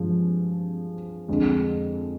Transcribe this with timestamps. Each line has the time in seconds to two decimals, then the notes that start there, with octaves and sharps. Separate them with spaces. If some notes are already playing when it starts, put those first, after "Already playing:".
Already playing: G2 F3 G#3
1.28 F2 D3 G#3